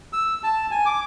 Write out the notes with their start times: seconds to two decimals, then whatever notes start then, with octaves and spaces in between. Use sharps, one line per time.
0.13 E6
0.43 A5
0.71 G#5
0.86 D6